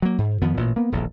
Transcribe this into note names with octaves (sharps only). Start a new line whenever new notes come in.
F#3 A#3
G#2
F2 D#3 F3 B3
A1 A#2
A#3 B3
D#1 A#1 E2